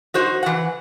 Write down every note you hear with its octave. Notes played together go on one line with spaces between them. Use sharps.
D#4 F#4 C5
E3 F#5